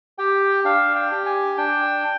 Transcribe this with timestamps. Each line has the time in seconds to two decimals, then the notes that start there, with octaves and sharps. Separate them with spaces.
0.18 G4 G5
0.64 D4 F5
0.95 G5
1.11 G4
1.26 G#5
1.57 D4 G5